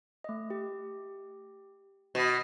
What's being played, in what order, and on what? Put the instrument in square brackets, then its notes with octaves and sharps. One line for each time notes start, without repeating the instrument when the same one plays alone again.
[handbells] A3 D#5
G4
[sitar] B2